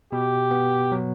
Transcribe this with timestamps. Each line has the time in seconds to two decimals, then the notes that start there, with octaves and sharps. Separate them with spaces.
0.12 B2 G4
0.51 B3
0.92 F#3